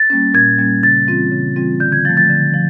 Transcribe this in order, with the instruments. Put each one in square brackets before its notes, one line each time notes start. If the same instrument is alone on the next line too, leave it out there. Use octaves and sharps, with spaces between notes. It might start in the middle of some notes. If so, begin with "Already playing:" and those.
Already playing: [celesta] A6
[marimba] G3 A#3 C#4
[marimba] A#2 [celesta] G#6
[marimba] G3 A#3 C#4
[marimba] C#3 [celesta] A6
[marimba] E3 G3 C4 F4
C#3
E3 G3 C4 F4
[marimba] D3 [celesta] G6
[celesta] G#6
[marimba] F3 A3 [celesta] A6
[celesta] A6
[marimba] D3
F3